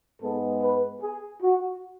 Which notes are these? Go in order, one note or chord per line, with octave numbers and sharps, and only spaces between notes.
G#2 G#3 B3 A4
B4
G#4
F#4